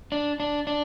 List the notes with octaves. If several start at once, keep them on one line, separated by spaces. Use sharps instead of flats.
D4
D4
D4